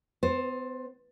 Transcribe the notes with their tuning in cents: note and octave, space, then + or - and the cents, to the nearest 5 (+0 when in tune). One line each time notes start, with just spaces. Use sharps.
B3 +40 C5 +15